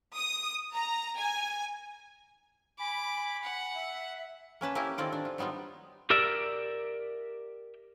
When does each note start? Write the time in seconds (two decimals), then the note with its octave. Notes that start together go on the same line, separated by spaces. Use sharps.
0.15 D#6
0.73 A#5
1.18 G#5
2.79 G#5 B5 D6
3.43 F#5
3.75 E5
4.61 A#3 C#4 B4 A5
4.75 A#3 C#4 E4 G4 A#4
4.98 D#3 C4 F4 A4 D5
5.12 D4
5.25 F4
5.38 F#3 G3 B3 D#4 F4
6.10 G4 A#4 D5 E5